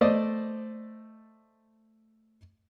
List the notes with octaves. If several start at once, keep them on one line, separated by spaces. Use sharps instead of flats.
A3 C5 D5 D#5